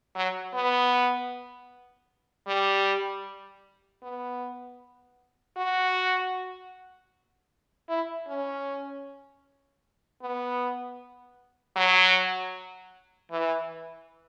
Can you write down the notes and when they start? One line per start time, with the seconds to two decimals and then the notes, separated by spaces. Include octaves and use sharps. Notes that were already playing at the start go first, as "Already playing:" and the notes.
0.16 F#3
0.54 B3
2.47 G3
4.03 B3
5.57 F#4
7.89 E4
8.28 C#4
10.22 B3
11.76 F#3
13.31 E3